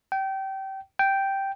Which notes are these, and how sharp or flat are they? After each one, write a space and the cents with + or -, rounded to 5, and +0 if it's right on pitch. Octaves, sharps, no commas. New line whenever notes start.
G5 -25
G5 -5